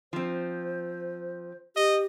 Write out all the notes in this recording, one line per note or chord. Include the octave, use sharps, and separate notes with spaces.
F3 C4 C5
G4 D#5